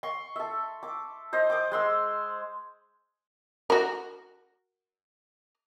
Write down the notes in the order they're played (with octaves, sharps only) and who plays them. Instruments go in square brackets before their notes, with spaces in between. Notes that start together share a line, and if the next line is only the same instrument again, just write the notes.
[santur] C6 C#6
A4 E5
D6
C5 D#5
D6 D#6
G#3 C6 E6
[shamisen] F#4 A#4